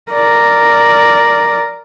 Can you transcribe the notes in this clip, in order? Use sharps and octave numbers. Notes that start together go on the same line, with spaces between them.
A#4 D5